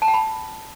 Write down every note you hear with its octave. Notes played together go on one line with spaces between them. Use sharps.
A5
G5
B5